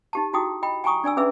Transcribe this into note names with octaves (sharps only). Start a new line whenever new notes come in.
D#4 G4 A5
D#4 E4 F#4 G#4 G5 D#6
D#5 G5 B5
G5 G#5 A#5 C#6 D#6
D4 D5 G#5 E6
C#4 G#4 B4 E5 E6